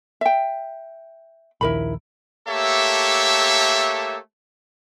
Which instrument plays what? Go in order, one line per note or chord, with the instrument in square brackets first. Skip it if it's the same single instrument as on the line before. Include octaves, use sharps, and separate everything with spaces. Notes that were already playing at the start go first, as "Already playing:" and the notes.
[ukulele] E5 G5
[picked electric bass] A#1 D#2 [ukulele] E4 A#4 B5
[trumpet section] A3 A#3 G4 A4 C#5 E5